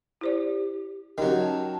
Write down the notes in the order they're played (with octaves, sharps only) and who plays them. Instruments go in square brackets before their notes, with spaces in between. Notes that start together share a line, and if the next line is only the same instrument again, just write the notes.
[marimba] E4 C5 D5 [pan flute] G4
[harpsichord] D#3 F#3 [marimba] C#4 F#5 [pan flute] G4
[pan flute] A5